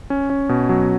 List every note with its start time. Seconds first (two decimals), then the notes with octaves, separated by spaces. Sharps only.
0.10 C#4
0.30 C#4
0.49 B2
0.69 F#3